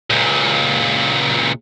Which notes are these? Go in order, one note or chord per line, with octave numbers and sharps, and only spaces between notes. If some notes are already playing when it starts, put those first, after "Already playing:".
C#2 A#2